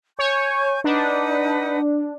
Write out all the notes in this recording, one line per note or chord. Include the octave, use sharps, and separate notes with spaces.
C#5 G#5 C#6 G6
D4 D#4 B4 F#5